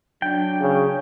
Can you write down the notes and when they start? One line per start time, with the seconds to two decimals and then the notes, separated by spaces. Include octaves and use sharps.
0.22 F#3 D4 G5
0.61 C#3